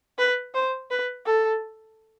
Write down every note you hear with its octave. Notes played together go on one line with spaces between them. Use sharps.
B4
C5
B4
A4